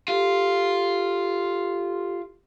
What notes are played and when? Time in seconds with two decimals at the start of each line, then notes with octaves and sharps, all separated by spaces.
0.08 F4 G4 A4